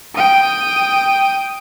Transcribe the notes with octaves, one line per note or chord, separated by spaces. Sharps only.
G5 D#6